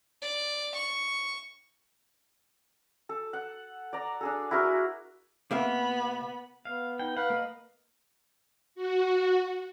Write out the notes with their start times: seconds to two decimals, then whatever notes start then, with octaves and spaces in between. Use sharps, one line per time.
0.22 D5
0.75 C#6
3.09 A4
3.33 F#5
3.93 D5 A#5
4.21 D4 G#4 A4
4.51 E4 F#4 G#4 A#4
5.51 C3 A#3 B3 E5 B5
6.65 B3 F5
6.99 D#4 G5
7.17 B4 F5 F#5
7.30 A#3 D#5
8.75 F#4